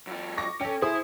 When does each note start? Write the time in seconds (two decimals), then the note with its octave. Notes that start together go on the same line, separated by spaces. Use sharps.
0.07 F#2 F4
0.38 C#6 D6 A#6
0.61 C#4 A4 G5
0.82 E4 G#4 C5 D#6